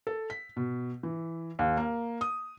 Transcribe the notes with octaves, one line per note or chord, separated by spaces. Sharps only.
A4
B6
B2
E3
D#2
A#3
D#6